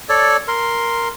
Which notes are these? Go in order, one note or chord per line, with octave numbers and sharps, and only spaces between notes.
A4 C#5 D5
A#4 C6